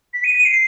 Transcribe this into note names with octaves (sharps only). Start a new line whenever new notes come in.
B6
D#7
D#7
C7